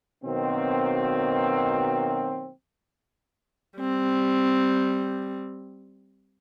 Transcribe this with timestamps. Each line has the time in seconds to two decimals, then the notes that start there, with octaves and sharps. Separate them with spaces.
0.24 B2 D#3 F#3 A#3 C4
3.79 G3 C4